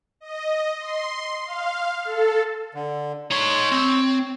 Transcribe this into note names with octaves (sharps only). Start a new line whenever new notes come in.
D#5
C6
F5
A4
D3
D#4 C#5 C6
C4